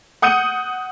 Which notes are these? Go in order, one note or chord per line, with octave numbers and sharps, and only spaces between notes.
F#5 D#6 G6 C#7 D#7